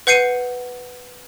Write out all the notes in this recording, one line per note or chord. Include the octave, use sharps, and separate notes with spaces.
B4 F#5 G6 C7 C#7 D#7